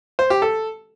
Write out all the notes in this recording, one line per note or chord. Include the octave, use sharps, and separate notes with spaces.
C5
G4
A4